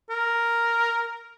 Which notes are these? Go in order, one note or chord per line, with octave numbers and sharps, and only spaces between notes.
A#4